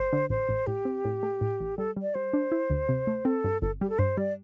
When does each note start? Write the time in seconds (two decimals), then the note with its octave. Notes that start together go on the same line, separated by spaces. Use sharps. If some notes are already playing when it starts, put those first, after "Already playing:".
Already playing: G1 C5
0.13 D3
0.30 A1 C5
0.49 A1
0.67 A2 G4
0.85 C4
1.05 A2
1.23 A3
1.41 A2
1.60 A1
1.78 G3 A4
1.96 G3
2.02 D5
2.15 G3 C5
2.33 D4
2.52 E4
2.70 D2
2.89 C3
3.07 A3
3.25 C4 A4
3.44 G2
3.62 G1 A4
3.81 G3 G4
3.90 A4
3.99 G2 C5
4.17 G3 D5